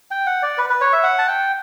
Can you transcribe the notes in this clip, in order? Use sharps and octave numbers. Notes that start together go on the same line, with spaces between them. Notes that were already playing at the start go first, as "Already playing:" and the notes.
G5
F#5
D5
B4
B4
C#5
E5
F#5
A5
G5